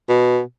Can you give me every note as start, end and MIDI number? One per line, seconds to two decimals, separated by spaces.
0.09 0.40 47